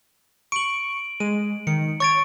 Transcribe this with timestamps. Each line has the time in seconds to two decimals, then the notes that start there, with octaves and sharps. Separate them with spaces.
0.52 C#6 D7 F#7
1.20 G#3 D#7
1.67 D#3 C#7
2.00 C#5 C#6 A6 D7